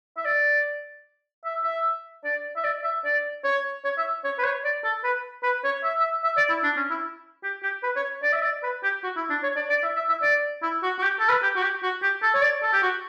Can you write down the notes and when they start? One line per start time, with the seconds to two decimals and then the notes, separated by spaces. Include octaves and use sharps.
0.17 E5
0.25 D5
1.45 E5
1.64 E5
2.24 D5
2.57 E5
2.64 D5
2.84 E5
3.05 D5
3.44 C#5
3.84 C#5
3.98 E5
4.24 C#5
4.39 B4
4.44 C#5
4.64 D5
4.84 A4
5.04 B4
5.43 B4
5.64 C#5
5.84 E5
6.00 E5
6.24 E5
6.37 D5
6.50 E4
6.64 D4
6.77 C#4
6.90 E4
7.43 G4
7.63 G4
7.83 B4
7.96 C#5
8.23 D5
8.33 E5
8.43 D5
8.63 B4
8.83 G4
9.03 F#4
9.17 E4
9.30 D4
9.43 C#5
9.56 D5
9.70 D5
9.83 E5
9.96 E5
10.09 E5
10.22 D5
10.63 E4
10.83 F#4
10.98 F#4
11.03 G4
11.20 A4
11.29 B4
11.43 G4
11.56 F#4
11.63 G4
11.83 F#4
12.03 G4
12.23 A4
12.35 C#5
12.42 D5
12.63 A4
12.73 G4
12.82 F#4